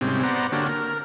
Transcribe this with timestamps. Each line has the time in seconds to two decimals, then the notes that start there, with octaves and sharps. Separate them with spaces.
0.01 G#2 C3 G3 C4 C#4
0.23 B3 C5 D5 F#5 A#5
0.52 D3 A#3 D4 F#4 G4 C#5
0.68 A#4